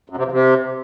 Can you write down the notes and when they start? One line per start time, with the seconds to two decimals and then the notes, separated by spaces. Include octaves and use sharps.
0.10 F#2
0.17 C3
0.25 F2
0.32 C3